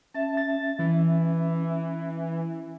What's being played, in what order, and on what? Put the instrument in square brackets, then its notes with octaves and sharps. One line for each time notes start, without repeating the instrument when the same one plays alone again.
[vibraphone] C#4 E5 [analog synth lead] A5
[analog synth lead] A6
E3